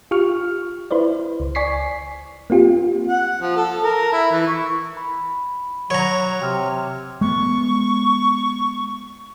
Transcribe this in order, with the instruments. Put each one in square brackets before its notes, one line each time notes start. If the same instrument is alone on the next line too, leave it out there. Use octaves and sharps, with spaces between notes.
[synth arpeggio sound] F4 G4 C#6 F6
E4 B4 C5 D5
C#2
D5 G#5 C#6 B6 C7
A#3 C4 F4 G4
[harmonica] F#5
F3
A4
A#4
E4
E3
C#6
[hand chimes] B5
[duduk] F#3 [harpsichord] C#5 A#5
[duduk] C3 [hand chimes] G5 F6
[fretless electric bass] G#3 B3 [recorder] C#6